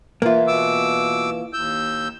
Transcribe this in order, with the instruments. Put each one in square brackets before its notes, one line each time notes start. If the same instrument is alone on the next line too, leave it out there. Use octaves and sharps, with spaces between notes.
[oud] E3 [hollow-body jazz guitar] A#3 F4
[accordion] B2 D6 E6
D#2 E6 G6